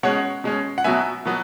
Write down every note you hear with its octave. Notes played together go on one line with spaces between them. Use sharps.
B2 G#3 C#4 C#5 F#5
B2 G#3 C#4
F#5
B2 F#3 B3 E5 G#5
B2 F#3 B3